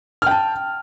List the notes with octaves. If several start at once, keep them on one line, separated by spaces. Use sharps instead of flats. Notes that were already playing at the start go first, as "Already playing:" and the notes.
G5 A5 F6